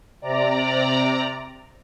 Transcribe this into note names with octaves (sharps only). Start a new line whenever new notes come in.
C3 D5 A#5